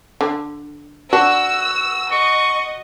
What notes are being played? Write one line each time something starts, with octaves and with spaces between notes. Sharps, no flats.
D3
D4 F#4 E6
D#5 C#6